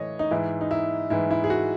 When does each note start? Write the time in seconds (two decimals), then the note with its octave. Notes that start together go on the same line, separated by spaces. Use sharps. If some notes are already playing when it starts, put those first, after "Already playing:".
Already playing: A2 E3 C#5 D#5
0.19 D#4
0.31 G#2 E3 E4
0.61 D#4
0.71 E4
1.10 G#2 E3 E4
1.31 E4
1.44 G#4
1.50 F#4